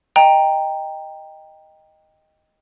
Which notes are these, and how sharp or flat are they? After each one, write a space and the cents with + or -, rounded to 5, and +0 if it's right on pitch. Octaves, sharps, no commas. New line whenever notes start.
D#5 +0 G5 +10 A#5 +0